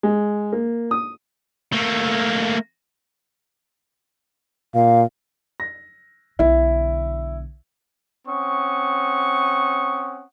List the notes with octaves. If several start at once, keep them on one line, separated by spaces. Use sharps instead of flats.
G#3
A#3
D#6
A3 A#3
A#2 F5
A#6
B1 D3 E4
C4 C#4 F#5 C#6 D#6